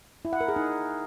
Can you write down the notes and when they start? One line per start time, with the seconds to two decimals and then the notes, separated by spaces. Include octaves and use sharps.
0.25 E4
0.33 F#5
0.41 A#4
0.48 G#4
0.56 D#4